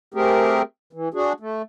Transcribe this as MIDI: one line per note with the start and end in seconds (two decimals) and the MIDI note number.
0.14 0.62 57
0.14 0.62 60
0.14 0.62 67
0.14 0.62 68
0.14 0.62 70
0.93 1.09 52
1.14 1.33 62
1.14 1.33 66
1.14 1.33 68
1.40 1.62 57